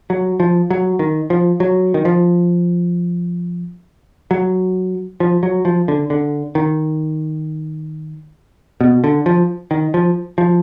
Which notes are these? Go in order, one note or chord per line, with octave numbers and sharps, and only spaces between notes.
F#3
F3
F#3
D#3
F3
F#3
D#3
F3
F#3
F3
F#3
F3
D3
D3
D#3
B2
D3
F3
D#3
F3
F3